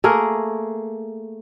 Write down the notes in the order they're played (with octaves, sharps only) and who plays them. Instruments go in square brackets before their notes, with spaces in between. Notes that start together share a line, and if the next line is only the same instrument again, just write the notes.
[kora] A3 A#3 G#4 A#4